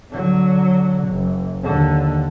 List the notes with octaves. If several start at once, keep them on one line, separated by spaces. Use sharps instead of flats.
D3 F#3
F#1
D#2 D3